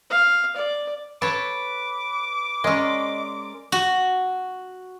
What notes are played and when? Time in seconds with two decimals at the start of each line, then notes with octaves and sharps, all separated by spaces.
0.10 F5
0.56 D5
1.22 A4 B4 C#5 D6
2.64 G#3 C#4 A#4 D5 D#5 C6
3.72 F#4